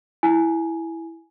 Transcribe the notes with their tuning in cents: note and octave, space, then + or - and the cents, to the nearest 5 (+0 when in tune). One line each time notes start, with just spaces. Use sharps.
E4 +0 G#5 +10